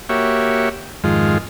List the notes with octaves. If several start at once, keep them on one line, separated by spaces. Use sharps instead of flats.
A#3 F#4 G4 C#5 E5
F2 G#2 D#3 G#3 F4